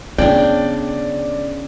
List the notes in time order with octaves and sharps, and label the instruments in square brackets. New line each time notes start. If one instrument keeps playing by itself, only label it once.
[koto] C#3 D4 [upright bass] B3 C#4 [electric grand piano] D5 [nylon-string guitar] G5